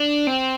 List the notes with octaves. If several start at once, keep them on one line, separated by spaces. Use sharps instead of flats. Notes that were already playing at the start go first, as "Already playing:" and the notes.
Already playing: D4
C4